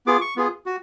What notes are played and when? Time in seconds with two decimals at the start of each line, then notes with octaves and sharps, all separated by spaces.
0.06 B3 F4 G#4 D6
0.21 C#6
0.36 B3 F4 G#4
0.66 F#4